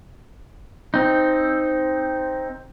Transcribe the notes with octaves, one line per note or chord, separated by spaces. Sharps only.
C4 D#4